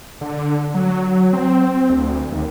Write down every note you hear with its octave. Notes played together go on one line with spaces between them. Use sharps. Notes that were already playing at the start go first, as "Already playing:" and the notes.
D3
F#3
C4
D2
D#2